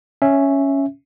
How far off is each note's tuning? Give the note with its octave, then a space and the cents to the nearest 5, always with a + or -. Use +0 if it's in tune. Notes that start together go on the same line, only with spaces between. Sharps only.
C#4 +0 E5 +0